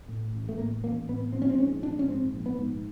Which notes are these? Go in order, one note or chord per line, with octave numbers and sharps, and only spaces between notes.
A2
A1
A3
A2 A#3
A1 A#3
A2 B3
A#1 C4
C#4
C4
G#2 C#4
A#1 D4
C#4
G#2 C4
A#1
B3
G#2